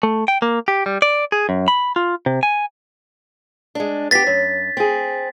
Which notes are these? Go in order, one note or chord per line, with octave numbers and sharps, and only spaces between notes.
A3
G5
A#3
G4
G3
D5
G#4
F#2
B5
F4
C3
G#5
G#3 D4
B3 F#4 G4 A6 B6
F#2
C4 G#4